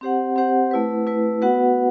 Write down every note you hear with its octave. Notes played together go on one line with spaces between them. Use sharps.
C4 G4 C5 F#5
C4 G4 C5 F#5
A3 E4 B4
A3 E4 B4
B3 F#4 B4 F#5